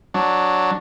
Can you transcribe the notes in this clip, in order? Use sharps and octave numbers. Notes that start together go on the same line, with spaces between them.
F#3 D4